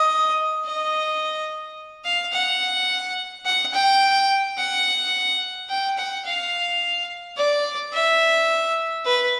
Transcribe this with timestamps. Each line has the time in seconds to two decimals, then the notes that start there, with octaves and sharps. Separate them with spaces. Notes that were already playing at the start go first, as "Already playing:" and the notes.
Already playing: D#5
0.65 D#5
2.05 F5
2.33 F#5
3.45 F#5
3.73 G5
4.58 F#5
5.69 G5
5.98 F#5
6.26 F5
7.37 D5
7.93 E5
9.06 B4